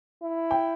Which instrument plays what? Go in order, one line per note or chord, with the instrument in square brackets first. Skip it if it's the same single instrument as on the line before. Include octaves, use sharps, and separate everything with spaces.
[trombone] E4
[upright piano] G5